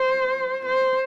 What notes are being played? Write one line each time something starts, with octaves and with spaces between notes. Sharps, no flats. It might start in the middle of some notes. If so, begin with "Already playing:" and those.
Already playing: C5
C5